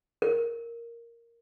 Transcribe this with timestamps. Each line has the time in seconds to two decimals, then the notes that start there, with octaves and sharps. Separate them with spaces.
0.22 A#4